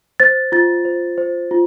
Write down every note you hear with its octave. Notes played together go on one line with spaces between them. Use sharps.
C5 A6
F4 A6
C5
C5
F4